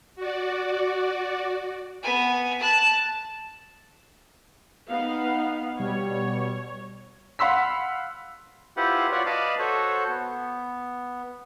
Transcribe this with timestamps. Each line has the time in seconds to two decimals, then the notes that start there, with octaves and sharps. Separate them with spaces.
0.16 F#4 D5
2.03 B3 G#5
2.59 A5 F#6
4.88 B3 D#4 F5
5.79 B2 G3 C#5
7.39 F5 F#5 B5 C6 E6 B6
8.77 E4 F4 G4 B4 C5 F#5
9.12 F4 F#4 C#5 D5 F#5
9.26 B4 D5 D#5 F5 A5 B5
9.59 F#4 A4 C5 C#5
10.09 B3